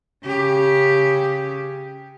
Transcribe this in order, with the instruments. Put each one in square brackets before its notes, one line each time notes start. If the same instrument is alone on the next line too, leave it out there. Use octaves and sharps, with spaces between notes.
[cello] C#3 G4